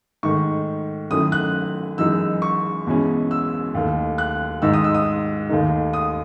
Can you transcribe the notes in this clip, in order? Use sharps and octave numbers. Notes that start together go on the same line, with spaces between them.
G#2 D#3 A3 C#6
F#2 D#3 A3 C#4 E4 D#6
F#6
F#2 E3 G#3 D#4 E6
C#6
E2 B2 G#3 C#4 E4
E6
D#2 D#3 A3
F#6
G#2 D#3 G#3 D#4 E6
D#6
E6
D#6
D#2 D#3 A3 D#4
D#6